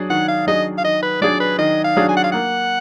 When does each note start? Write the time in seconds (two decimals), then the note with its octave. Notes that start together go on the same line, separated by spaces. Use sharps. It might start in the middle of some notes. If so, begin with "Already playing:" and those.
Already playing: F#3 D4 G#4
0.10 D#3 F#5
0.28 F5
0.47 F#3 D4 G#4 D#5
0.78 F5
0.84 D#3 D#5
1.03 B4
1.21 F#3 D4 G#4 D5
1.40 B4
1.59 D#3 D#5
1.84 F5
1.97 F#3 D4 G#4
2.09 G#5
2.17 F#5
2.24 F5
2.32 A#3 F#5